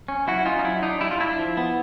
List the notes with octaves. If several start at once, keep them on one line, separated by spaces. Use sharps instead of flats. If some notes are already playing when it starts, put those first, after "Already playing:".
C#4
F#3 E4 F#4
C#4 D#4 F4
D#4
F#3 E4
D4 D#4
G3 E4
F4
D4 E4
F3
B3